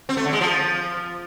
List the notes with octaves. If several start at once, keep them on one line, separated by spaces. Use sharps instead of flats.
C4
A3
D3
G#3
F3